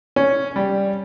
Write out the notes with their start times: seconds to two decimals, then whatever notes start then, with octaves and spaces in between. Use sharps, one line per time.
0.16 C#4
0.56 G3